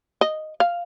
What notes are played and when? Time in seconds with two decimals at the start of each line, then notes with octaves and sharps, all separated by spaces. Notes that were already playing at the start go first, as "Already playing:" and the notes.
0.21 D#5
0.60 F5